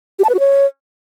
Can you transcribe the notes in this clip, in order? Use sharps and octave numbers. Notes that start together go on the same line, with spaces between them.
G4
A5
B4
F#4
C#5